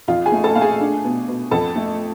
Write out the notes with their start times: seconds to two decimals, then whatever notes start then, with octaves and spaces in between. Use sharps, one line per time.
0.08 F2 F4 F5
0.26 G#4 G#5
0.32 A3
0.44 A4 A5
0.55 A3 F5
0.61 G#4 G#5
0.80 D4
1.04 B2
1.28 B2
1.51 F2 A4 A5
1.76 A3